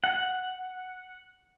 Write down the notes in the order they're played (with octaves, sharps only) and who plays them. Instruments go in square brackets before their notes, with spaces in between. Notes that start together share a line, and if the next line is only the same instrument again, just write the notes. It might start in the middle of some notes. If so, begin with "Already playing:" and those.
[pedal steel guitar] F#5